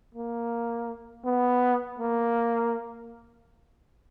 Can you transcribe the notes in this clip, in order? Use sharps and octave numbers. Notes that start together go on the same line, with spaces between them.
A#3
B3
A#3